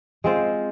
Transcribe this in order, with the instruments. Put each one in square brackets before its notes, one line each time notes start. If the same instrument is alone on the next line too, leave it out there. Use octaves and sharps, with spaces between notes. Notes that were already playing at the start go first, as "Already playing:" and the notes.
[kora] G#3 C4 F4 C5